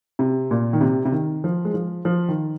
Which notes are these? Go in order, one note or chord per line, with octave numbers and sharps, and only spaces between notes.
C3
A#2
D#3
C3
C3
D#3
F3
G#3
F3
F3
D#3